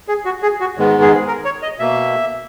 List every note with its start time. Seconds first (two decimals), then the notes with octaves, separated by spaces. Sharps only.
0.08 G#4
0.25 F#4
0.42 G#4
0.60 F#4
0.77 G#2 D#3 G#3 B3
1.02 G#4
1.27 A#4
1.45 C#5
1.62 D#5
1.79 B2 A#3 E5